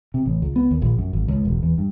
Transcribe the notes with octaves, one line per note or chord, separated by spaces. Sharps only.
C3
A1
C#2
B3
D#2
A#1
F#2
G#1
C#2
E1
E2
G2